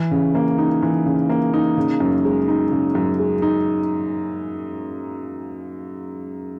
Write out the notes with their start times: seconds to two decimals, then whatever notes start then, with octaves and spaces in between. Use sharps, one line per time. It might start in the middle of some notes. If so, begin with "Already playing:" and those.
Already playing: E3
0.11 C#3
0.35 A#3
0.58 D#4
0.83 E3
1.06 C#3
1.30 A#3
1.53 D#4
1.77 C#3
2.00 F#2
2.25 G#3
2.48 D#4
2.72 C#3
2.95 F#2
3.19 G#3
3.42 D#4